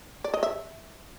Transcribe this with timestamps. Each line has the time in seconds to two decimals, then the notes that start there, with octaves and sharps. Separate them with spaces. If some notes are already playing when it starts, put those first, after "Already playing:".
0.24 D5
0.34 D#5
0.43 E5